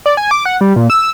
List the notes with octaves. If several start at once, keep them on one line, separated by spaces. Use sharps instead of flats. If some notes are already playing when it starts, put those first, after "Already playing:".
D5
G#5
D6
F#5
G3
A#2
E6